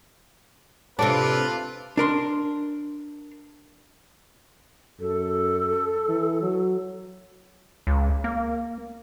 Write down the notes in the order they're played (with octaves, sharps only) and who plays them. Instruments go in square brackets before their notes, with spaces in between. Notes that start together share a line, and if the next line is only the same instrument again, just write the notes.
[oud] C3 A3 D4 [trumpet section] F4 B4 [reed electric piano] A5
[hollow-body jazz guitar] D4 A#4 C6
[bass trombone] F#2 [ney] A4
[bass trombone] E3
F#3
[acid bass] C#2
A#3